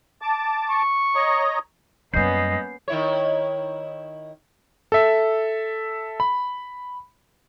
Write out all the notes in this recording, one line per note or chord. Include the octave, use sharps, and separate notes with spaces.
A5 D6
C#6
C#5 D#5 A#5
F#2 G3 A#3 B3 C#4 D#5 G6 C7
D#3 E4 C#5
A4 E5
B5